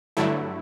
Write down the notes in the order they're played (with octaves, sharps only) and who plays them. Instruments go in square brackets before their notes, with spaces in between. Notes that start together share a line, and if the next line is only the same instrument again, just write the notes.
[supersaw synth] G2 D3 F#3 A3 E4